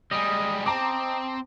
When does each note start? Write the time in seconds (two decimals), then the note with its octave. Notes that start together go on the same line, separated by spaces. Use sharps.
0.11 G3 G#3 D#5
0.66 C4 A5 A#5 D6